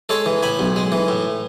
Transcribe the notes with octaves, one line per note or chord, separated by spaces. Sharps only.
G#3 A4 C#5
E3
A2 G#5 B5
B1
G#3
E3
A2